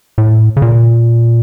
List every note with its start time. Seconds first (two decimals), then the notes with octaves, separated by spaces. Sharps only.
0.18 A2
0.57 C#3
0.62 A#2